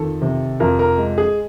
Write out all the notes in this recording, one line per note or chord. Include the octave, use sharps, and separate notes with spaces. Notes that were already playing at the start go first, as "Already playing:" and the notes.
Already playing: F2 D#3 A4
C3
F2 A#4
A#4
G#3
G#4